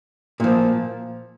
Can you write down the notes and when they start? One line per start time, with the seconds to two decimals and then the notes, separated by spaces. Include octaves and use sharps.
0.40 A#2 F3